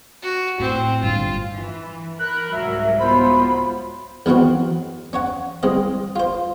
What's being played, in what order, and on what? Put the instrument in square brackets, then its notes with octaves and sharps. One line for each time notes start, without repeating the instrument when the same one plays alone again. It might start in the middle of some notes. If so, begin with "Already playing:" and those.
[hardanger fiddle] F#4
[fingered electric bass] A2 [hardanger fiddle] C4
[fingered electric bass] G1 G2 [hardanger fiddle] F4
[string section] E3
[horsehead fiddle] A#4 [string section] B5 [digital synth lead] F#6
[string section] C2 G#2 F#3 [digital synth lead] E5
[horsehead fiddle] B3 F4 [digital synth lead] C5 [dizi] B5
[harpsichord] E2 D#3 F#3 C4 F#4
C#4 C#5 F#5
C2 G#3 C4 D#5
F4 C5